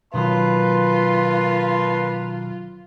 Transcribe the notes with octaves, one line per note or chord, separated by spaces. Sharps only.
B2 D#3 F#3 A#3 F4 B4 A5 C6